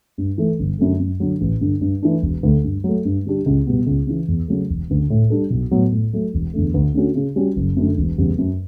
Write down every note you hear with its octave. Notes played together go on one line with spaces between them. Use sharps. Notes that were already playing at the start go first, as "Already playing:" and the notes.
G2
E3 A3
G1
F#2 D3 A3
F#2
D3 F#3
A1
G2 D3
G2
E3 A3 D4
E1
D2 D3 A3
G2
F#3 A3
G2
D3 G3 D4 G4
C#2
B2 G3 B3
C#2
C#3 E3
E2
C#3 F#3 A3
E1
D2 C#3
A2
G3 D4 A4
B1
A2 F#3 B3
A2
F#3 A3
E1
E2 D3 A3
D2
D3 A3 C#4 F#4
C#3
G3 C#4 F#4
F#1
F#2 D3 A3
E1
E2 C#3 G3
F#2